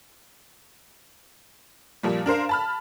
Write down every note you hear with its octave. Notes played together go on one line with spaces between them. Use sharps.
A#2 F3 G3
D4 A#4 C5 F5
A5 B5 F6